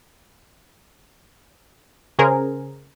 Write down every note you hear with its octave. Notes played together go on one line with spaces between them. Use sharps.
C#3 G#4 A#4 C5